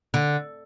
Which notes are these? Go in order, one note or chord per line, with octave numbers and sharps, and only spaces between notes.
D3